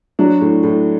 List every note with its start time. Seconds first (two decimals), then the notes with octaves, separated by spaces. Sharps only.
0.19 F#3 D4 F#4
0.41 A2
0.63 A2